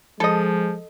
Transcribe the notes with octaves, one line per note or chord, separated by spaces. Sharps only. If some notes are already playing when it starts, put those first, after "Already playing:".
F3 G#3 A4 D#5